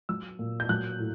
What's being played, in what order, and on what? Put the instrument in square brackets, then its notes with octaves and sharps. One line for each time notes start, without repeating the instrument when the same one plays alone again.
[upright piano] F#3 E6
A#2
G6
F#3 F#6
A2